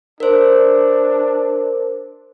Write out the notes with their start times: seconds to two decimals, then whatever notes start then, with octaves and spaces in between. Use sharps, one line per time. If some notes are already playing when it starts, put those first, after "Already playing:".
0.20 D4 A#4 C5